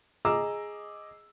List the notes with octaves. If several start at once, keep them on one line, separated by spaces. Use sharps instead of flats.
G#4 D#5 A#5 D6 E6